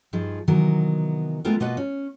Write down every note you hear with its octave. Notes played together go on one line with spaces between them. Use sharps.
G2 F3 D#4 G#4
C3 D#3 E3 F#3 B3 A#4
G#3 A3 B3 C4 F4 A#4
B2 A#3 F4 B4 D#5 F#5
C#4